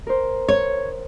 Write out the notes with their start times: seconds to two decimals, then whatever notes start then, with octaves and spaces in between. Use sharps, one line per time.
0.07 A#4 C5
0.48 C#5